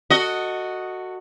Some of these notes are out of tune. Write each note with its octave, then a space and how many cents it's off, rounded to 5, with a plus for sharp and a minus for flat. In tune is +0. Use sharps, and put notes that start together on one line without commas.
F#4 +0 A4 +30 D#5 +0